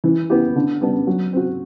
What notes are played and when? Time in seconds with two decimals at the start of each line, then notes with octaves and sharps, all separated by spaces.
0.04 E3
0.30 B3 E4 G4
0.56 D3
0.81 G3 B3 D4
1.07 F#3
1.33 C4 F#4